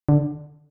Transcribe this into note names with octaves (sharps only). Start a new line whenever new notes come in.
D3